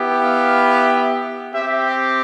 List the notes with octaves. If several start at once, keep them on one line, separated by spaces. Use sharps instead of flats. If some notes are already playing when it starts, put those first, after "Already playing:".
Already playing: B3 E4 G4
F5
C4 G4 E5